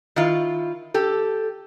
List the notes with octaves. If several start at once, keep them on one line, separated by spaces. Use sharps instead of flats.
D#3 E4 F4
G4 A4